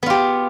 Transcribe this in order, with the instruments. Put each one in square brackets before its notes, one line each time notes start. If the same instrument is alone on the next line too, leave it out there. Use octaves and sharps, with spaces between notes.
[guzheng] B3
F4
G4